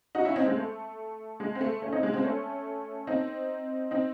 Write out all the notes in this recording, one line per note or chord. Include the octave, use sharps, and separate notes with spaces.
D#4 F#4
C#4 E4
C4 D#4
G#3 C4
A3
G#3
C4
A3
A3 C#4
C4 D#4
G#3
G#3 C4
A3 C#4
C4 D#4
C4 D#4